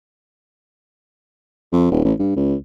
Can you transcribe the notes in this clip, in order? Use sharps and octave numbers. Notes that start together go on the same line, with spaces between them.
F2
D#1
A1
G2
C#2